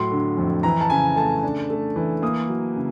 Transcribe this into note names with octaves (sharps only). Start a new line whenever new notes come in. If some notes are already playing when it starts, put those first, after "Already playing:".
Already playing: A2 F#3 C6
D3
F2
E3 A#5
A5
C#3 G#5
A3 A5
D4
A3
E3
A#3 D#6
F#3
C#3